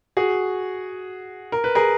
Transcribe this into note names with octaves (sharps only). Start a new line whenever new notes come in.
F#4 G#4
A#4
B4
G#4 A#4